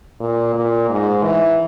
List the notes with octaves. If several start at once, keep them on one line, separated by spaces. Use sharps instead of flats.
A#2
A#2
G#2
E3